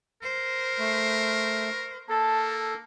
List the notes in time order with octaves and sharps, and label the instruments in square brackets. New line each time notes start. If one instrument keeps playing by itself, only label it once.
[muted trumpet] A#4 [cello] C5
[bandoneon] A3
[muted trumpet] A#3 [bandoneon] A4 [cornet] A5